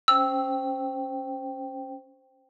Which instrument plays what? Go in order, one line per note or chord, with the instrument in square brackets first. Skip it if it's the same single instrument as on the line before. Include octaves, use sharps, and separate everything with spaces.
[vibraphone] C#4 C5 G5 [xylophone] E6